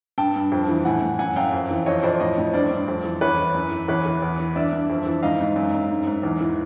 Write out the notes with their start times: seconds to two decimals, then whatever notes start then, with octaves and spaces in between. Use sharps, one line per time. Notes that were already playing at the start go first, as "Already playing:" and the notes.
0.18 G2 G5 A5
0.36 G2
0.52 F2
0.69 E3
0.85 A2 F#5 G#5
1.02 A2
1.19 F#2 F#5 G#5
1.36 F#2 F5 G5
1.53 F2
1.70 E3
1.86 F2 C#5 D#5
2.03 F2 C5 D5
2.20 A2 C#5 D#5
2.38 A2
2.54 G2 C5 D5
2.71 G2
2.88 F2
3.04 E3
3.21 E2 B4 C#5
3.37 E3
3.55 F#2
3.71 E3
3.88 E2 B4 C#5
4.06 E3
4.23 E2
4.39 E3
4.55 G2 D5 E5
4.73 G2
4.90 F2
5.06 E3
5.23 G#2 D#5 F5
5.40 G#2
5.56 F#2
5.74 F#2
5.91 G#2
6.07 G#2
6.23 E2
6.40 E3